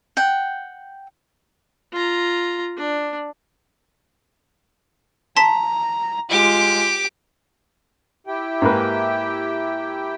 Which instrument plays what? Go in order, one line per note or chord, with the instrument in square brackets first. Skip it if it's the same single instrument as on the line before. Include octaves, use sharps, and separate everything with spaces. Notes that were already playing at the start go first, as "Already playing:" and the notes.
[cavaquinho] F#5 G5
[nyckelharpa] F4 A#5
D4
[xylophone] A5 C6 B6 [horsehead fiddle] A#5
[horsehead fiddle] G#3 F4 [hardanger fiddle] G4 D6
[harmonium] E4 G4 G5
[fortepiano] G#2 A#3 B4